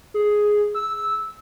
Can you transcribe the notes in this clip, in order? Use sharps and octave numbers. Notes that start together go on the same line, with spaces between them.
G#4
E6